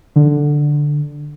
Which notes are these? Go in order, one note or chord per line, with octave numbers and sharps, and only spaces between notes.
D3